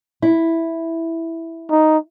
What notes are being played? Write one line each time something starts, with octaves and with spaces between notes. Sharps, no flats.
E4
D#4